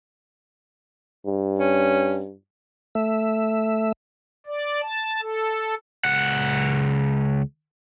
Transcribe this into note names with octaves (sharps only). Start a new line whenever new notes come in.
G2
C#4
A3 E5
D5
A5
A4
C#2 F#5